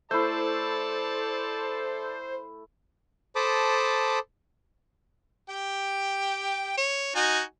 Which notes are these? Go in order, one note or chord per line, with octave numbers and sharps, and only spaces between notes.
A3 E4 A4 C5 D5 A5
A4 C5 A5 B5 D6 D#6
G4 G5
C#5
D#4 F#4 G#5